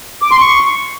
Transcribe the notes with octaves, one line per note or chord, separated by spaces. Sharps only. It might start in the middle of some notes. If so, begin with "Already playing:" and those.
D6
C6
C#6